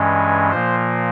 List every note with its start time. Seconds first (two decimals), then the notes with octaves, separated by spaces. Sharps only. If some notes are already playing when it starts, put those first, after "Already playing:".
Already playing: G2 E3 G#3 C#4
0.51 A#2 F3 A#3 C5